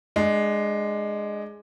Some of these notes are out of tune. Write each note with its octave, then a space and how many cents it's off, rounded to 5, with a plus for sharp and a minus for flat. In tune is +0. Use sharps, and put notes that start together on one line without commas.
G#3 +0 D4 +20